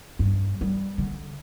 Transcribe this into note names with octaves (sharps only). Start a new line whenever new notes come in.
G2
G3
D3